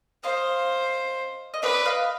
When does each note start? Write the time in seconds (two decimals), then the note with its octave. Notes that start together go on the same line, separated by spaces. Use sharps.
0.23 C5 D#5 F5
1.54 D#5
1.62 B4 D5 E5
1.85 D#5 F5